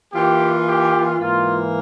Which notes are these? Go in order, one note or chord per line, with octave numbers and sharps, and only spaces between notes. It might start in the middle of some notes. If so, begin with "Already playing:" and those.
E3 A#3 F4 G4
G4
G#2 E3 A#3 F4